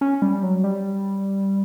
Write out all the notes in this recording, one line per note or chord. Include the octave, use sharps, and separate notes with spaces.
C#4
G3
F#3
G3